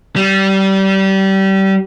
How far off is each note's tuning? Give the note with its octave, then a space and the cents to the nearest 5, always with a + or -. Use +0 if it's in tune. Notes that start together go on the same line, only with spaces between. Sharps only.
G3 -25